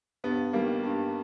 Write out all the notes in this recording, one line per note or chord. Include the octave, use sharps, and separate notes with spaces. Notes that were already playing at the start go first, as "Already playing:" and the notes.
G2 B3
D#3 G3 A#3
G2